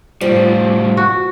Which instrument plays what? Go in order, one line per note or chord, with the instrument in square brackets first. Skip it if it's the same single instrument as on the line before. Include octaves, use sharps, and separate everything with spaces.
[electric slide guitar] A2 G3 [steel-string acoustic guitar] F3
[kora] F#4